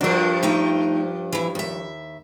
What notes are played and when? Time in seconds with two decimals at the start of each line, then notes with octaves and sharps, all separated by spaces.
0.01 G2 F3 D4 F#4 A#4
0.43 A3 D#4 G5
1.33 E3 E4
1.55 D#2 E5